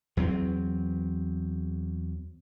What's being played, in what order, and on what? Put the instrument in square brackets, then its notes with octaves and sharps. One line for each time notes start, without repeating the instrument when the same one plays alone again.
[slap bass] E2 F#3 C4